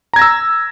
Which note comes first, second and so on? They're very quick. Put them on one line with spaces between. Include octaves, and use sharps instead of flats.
A#5 G#6 A#6 E6